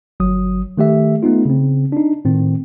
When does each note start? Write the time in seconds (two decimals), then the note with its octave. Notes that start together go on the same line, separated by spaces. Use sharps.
0.20 G1 F#3 D#6
0.78 D#3 A3 G4 E5
1.23 A3 B3 D#4 F4
1.45 C#3 C4
1.92 D4 D#4
2.25 A2 D#3 C4